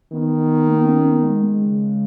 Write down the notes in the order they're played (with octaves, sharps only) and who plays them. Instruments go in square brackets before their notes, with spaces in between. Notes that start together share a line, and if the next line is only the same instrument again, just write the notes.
[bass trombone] D#3 [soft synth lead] B3
[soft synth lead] A#3
B3
C#4
B3
G#3
G#3
[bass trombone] C#3